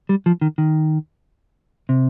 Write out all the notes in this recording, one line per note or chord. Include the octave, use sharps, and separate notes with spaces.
G3
F3
D#3
D#3
C3